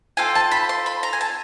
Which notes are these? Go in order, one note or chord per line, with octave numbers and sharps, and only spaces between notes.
C4 F4 A4 G#5
A5
B5
C6
B5
A#5
G#5
A5